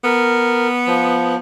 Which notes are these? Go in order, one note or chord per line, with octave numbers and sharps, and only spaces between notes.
B3 A#4
F3